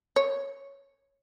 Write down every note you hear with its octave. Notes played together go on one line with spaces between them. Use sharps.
C#5